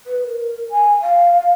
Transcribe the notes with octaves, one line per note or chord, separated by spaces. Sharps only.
B4
A#4
G#5
F5